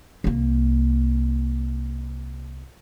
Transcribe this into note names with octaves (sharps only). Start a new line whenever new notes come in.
C2 A#3